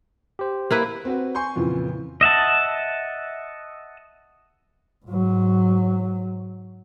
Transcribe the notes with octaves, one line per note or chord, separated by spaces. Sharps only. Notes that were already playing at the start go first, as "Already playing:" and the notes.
G4 C5
A#3 E4 B4
C4 F#4 B4
G#5 C6 C#6 G6
F2 A#2 C#3 E3
D#5 E5 F#5 A5
G#2 F#3